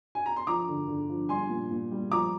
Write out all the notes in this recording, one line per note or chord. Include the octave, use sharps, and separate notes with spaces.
G#5
A#5
C6
F3 A#5 D6
D3
D3
F3
G3 G#5 C6
A#2
A#2
G3
F3 A#5 D6